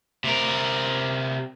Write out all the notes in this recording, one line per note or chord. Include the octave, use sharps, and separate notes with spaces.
C3 A#4